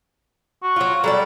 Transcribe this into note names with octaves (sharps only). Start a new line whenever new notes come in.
F#4
F#3 F4
F#3 G3 A4 D5